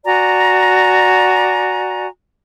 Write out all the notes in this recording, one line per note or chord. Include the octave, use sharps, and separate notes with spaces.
F#4 D5 G#5 A#5